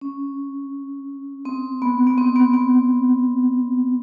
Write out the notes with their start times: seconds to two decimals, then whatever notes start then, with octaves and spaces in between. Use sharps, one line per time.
0.01 C#4
1.45 C4
1.82 B3
2.07 B3
2.18 C4
2.36 B3
2.54 B3